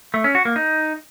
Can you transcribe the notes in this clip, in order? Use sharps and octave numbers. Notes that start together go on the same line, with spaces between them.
A3
C#4
F#4
A#3
D#4